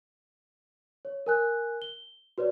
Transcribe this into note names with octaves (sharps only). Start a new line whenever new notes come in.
C#5
A#4 G#5 F#6
G7
F#4 B4 C#5 D5